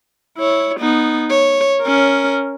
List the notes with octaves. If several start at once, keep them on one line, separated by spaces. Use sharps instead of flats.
E4 C#5
B3 D#4
C#5
C#4 A#4